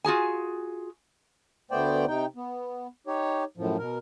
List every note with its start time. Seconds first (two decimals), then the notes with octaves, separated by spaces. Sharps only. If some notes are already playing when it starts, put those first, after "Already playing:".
0.04 F4 F#4 G#4 G#5
1.71 D2 A3 B3 C5 D5 G5
2.08 C3 D#4 G5
2.36 B3
3.07 D#4 G4 C#5
3.57 F#2 A2 F3
3.79 B2 A#4